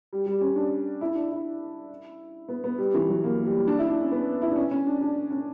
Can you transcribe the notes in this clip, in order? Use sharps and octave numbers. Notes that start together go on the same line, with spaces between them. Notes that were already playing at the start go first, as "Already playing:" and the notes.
G3
G3
C#4
D4
E4
D4
E4
B3
B3
G3
E3
F#3
A#3
G3
D4
E4
D4
C#4
B3
E4
D4
C#4
C#4
D4
D4
C#4